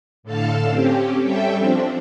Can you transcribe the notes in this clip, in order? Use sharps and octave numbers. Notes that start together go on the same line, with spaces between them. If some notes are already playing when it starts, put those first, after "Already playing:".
A2 D3 A4 F5 A5
C4 C#4 G4
G3 C#4 A4 E5 G5
F3 C4 D4